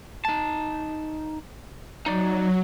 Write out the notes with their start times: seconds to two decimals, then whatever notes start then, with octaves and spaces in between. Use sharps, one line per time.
0.25 D#4 A5
2.06 F#3 D#4 D5